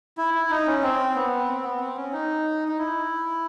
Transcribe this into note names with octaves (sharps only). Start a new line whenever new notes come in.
E4
E4
D#4
C#4
C4
B3
C4
B3
C4
C#4
D#4
D#4
E4